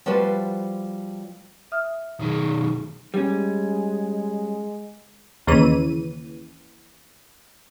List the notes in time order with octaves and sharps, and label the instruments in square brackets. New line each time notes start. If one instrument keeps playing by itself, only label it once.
[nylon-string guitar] F3 G3 F#4 G4 B4 C5
[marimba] E5 D#6 F6
[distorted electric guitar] B1 D#3 [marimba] D#4 G#4
[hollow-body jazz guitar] G3 C#4 [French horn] G#3
[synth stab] D#2 C#3 E3 D#7